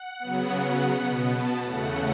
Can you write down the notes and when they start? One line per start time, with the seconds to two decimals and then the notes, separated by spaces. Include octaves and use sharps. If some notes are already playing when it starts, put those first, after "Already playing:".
Already playing: F#5
0.19 C#3 F#3 B3
0.91 B2 B3
1.26 A5
1.61 E2 C#3 A3 F#5